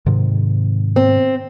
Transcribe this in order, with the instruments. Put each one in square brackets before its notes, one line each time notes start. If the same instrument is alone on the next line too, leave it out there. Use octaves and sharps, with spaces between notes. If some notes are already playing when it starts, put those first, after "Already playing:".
[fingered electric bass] G#2 C3 D#3
[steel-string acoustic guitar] C4